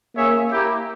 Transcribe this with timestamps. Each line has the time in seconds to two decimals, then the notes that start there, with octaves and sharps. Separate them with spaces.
0.16 A#3 C#4 G#4 C#5 E5
0.51 A#3 E4 G4